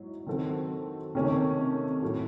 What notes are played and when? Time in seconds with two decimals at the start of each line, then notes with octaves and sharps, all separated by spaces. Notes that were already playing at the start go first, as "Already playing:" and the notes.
Already playing: G#2 F#3 E4
0.27 D#3 F#3 C4 F#4 A4
1.15 C3 D#3 A3 C#4
2.02 A2 F#3 A3